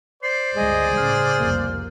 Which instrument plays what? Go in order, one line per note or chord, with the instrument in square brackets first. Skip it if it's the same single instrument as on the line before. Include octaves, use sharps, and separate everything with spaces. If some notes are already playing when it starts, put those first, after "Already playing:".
[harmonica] C5 D5 [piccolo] C7
[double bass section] G1 C#2 G#3 [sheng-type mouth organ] G#4 [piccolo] D#5
[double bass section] A2 C#3 [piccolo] F6
[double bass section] F1 C2 A#3